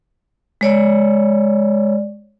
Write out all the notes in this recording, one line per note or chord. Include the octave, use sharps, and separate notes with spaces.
G#3 C#5 D5